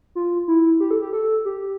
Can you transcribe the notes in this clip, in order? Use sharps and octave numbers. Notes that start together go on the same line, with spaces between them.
F4
E4
G4
A4
G4
A4
G4